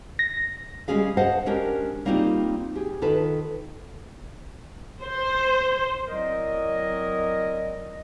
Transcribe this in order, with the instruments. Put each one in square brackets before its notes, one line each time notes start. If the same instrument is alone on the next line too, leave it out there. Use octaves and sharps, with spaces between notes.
[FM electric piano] A#6
[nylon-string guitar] G3 G#3 C#4 G#4 F5
C5 D#5 F5 F#5 A5
G#3 C#4 D4 G4 A#4
G3 A#3 C4 D#4 F4 G4
G4 G#4
D#3 F4 A4 B4
[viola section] C5
[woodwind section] F#3 C4 E4 A#4 D5 D#5